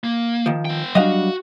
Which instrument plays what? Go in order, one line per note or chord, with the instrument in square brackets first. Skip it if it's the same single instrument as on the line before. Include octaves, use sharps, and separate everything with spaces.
[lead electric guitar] A#3
[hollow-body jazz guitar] D#3 F3
[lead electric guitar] B3 G5
[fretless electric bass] F#3 G3 D4 [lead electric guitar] F#4 [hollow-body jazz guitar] D#5 F5 F#5